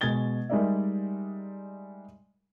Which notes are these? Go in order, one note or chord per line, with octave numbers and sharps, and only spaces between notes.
B2 G#3 G#6 A6 G7
G3 G#3 D#4 A#4 D5 E5